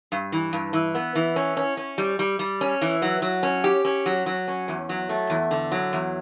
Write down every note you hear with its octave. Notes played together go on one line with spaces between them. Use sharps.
G2
E3
G2
E3
B3
E3
C#4
C#4
C#4
G3
G3
G3
C#4
E3
F#3
F#3
C#4
G4
C#4
F#3
F#3
C#4
E2
F#3
A3
E2
D3
F#3
E2